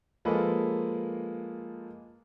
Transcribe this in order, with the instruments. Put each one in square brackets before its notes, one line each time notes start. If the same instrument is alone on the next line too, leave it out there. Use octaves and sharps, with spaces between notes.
[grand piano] F3 G#3 A#3 A4 B4